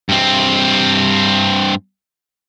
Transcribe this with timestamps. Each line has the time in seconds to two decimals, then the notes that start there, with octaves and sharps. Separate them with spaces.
0.09 G2 C4